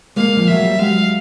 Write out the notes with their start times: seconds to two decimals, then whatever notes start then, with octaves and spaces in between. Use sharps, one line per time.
0.16 G#3 A#3 F5
0.37 F3
0.48 F#3 E5
0.65 G3
0.79 F#3 G#3 F5